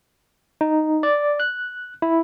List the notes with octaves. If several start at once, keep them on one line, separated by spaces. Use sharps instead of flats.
D#4
D5
F#6
E4